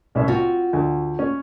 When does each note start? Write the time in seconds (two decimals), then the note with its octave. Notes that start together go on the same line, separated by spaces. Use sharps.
0.15 C2 C#4 E5
0.28 C4 F4 F#4
0.73 D2
1.19 C#4